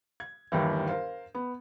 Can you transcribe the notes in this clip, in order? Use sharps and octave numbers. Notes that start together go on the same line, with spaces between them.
G#6
G1 D#2 D#3 E3
A#4 C5 F5
B3